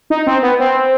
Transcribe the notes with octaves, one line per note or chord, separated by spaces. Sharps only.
D#4
C4
B3
C4